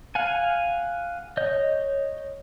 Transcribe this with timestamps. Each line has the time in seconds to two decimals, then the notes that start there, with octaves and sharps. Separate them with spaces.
0.15 F5 F#5 G#5
1.37 C#5 D#5 G6